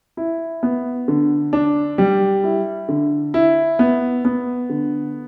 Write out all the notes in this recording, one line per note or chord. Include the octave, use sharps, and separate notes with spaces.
E4
B3
D3
D4
G3
E4
D3
E4
B3
B3
D3